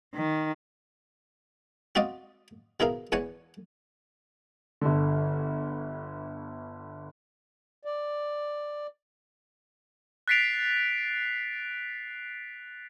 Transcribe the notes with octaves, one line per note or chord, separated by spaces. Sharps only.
D#3
C4 F#4 D5 D#5 F5
B2 E4 G#4 A#4 F5
E2 E3 C#5 F#5 G#5
G1 D3
D5
F#6 A6 B6 C7 D7 F7